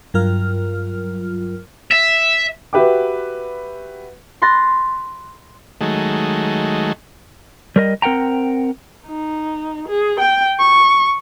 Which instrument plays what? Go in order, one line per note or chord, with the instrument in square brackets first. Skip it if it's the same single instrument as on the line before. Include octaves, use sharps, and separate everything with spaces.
[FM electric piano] G2 F#3 F4 A#4 F6
[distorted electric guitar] E5
[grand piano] F#4 G4 B4 E5 G5 D6
[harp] B5 C6 F#6 A6 A#6
[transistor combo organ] D#3 F#3 G#3 A3
[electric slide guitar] G3 A#4 D#5
C4 A#4 F#5 G5 A#5
[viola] D#4
G#4
G5
C#6